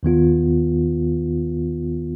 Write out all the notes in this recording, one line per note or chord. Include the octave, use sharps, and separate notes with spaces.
D#2 D#3 B3 F4